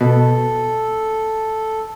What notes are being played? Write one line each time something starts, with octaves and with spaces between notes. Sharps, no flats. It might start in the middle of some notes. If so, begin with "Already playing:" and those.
B2 A4